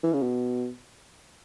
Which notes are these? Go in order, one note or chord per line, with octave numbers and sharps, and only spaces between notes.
E3
C#3
B2